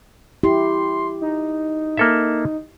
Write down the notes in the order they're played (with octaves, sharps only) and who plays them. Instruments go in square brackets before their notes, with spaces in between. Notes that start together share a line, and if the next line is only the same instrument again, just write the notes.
[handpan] E4 G4 [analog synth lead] C6
[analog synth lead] D#4
[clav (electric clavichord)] A#3 A4 E5